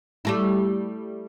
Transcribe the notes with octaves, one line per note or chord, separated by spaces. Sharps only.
G3 A3 E4